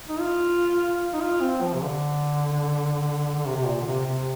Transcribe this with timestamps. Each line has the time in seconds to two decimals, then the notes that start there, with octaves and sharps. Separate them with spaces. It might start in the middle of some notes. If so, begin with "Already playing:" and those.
0.08 D#4
0.19 F4
1.14 D#4
1.21 F4
1.41 C4
1.62 F3
1.74 C3
1.83 D3
3.39 D3
3.46 C3
3.56 C3
3.66 A#2
3.81 D3
3.86 C3
4.06 C3